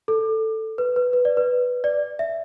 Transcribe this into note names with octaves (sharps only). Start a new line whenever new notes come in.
A4
B4
B4
B4
D5
B4
D5
E5